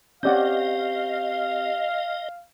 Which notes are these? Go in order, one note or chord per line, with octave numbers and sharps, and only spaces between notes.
C4 C#4 G4 D5 D#5 F5 F#5 G6